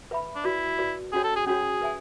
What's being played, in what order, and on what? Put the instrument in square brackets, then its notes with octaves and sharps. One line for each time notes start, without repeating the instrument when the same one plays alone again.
[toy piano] B4 E5 B5
[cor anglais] D4
[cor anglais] E4 [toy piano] F#4 B4 D5
[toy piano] F#4 B4 D5
[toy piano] C#4 F#4 C#5 [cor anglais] G#4
[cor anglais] A4
G#4
[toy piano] C#4 F#4 C#5 [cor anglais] G#4
[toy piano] B4 E5 G#5